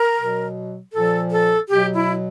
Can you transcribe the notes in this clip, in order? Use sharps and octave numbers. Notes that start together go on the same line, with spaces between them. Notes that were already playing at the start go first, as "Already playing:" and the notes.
Already playing: A#4
B2 F#3
A#2 F3 A4
A4
B2 F#3 G4
E4